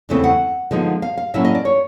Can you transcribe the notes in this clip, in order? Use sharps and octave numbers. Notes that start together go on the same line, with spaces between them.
E2 C#3 E3 A3 C4
F#5
D3 F3 G#3 B3 D#4
F5
F5
A2 F#3 A#3 C#4 E4 E5
D#5
D5
C#5